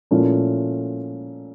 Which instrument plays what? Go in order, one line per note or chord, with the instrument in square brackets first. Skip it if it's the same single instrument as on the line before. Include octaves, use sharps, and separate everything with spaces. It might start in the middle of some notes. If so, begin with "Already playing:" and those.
[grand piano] A#2 F3 A3 C#4 E4